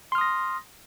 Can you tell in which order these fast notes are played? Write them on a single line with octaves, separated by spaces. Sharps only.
C6 F6 D#6 A#6